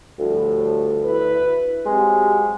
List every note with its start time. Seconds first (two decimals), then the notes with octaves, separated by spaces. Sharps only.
0.19 D2 A2 F3 G3
1.04 E4 B4
1.86 F#3 G#3 C4 G4